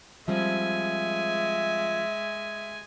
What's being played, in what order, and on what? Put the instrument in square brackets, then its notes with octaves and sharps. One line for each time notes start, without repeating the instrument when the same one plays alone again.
[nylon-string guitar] F3 G3 C4 [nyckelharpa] G#3 G#5 [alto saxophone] E5